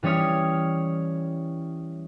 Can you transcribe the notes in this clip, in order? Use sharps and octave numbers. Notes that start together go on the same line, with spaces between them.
E3 G3 C#4 C#5 D#6 F6